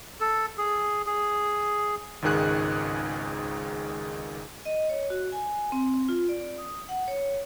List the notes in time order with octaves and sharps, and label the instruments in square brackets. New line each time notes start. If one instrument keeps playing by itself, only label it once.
[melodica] A4
G#4
G#4
[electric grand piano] G#1 C#2 G#2 D#3 G#4 F#6
[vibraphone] D#5
C#5
F#4
G#5
C4
F4
D5
D#6
F#5
C#5